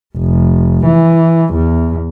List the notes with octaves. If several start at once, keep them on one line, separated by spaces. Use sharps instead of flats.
F1
E3
E2